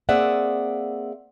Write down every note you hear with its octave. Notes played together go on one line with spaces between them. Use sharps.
A#3 C4 G#4 D5 E5 F#5